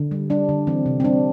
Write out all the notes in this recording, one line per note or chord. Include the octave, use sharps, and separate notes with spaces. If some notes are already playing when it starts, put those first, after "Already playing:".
Already playing: D3
G3
G3 D4
D3
E3 C4
C3
C4
G3 D4